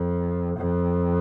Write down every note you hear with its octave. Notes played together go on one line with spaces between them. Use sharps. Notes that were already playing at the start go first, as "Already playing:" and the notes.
Already playing: F2
F2